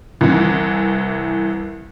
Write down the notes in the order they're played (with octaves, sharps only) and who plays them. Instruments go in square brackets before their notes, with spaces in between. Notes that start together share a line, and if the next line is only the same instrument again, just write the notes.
[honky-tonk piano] C2 E3